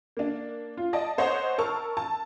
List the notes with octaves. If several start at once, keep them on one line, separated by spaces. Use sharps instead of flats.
A#3 D4
F4
D5 D#5 A5
A4 C5 C#5 D#5 F#5
A#4 A5 C#6 E6 F6
A5